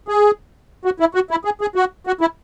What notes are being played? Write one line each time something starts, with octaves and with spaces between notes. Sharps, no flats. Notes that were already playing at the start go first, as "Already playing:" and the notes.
G#4
F#4
E4
F#4
E4
G#4
G#4
F#4
F#4
E4